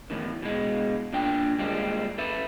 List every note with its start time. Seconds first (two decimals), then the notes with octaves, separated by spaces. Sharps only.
0.10 E2 A2 D#3
0.42 B2 G#3
1.13 A#2 D4 G5
1.59 A#2 G3 G#3 C4
2.18 A4 B4 E5